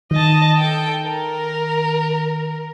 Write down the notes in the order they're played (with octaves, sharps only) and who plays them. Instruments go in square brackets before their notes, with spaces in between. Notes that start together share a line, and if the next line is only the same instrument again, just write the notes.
[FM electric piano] D#3 [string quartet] D#5 A5
[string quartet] A4 G5
A#4